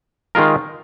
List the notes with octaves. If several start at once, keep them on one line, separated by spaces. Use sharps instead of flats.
D#3 G#3 F4 A#4